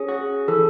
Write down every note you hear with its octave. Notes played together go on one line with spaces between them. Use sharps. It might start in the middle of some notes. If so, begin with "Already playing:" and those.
Already playing: C#4 G#4
F#4
E3 A4